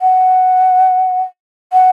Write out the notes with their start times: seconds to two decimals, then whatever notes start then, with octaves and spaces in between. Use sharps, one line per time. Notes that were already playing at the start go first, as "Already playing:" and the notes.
0.01 F#5
1.73 F#5